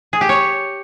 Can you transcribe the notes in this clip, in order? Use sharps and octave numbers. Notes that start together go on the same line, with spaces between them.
G#4
G4
C#5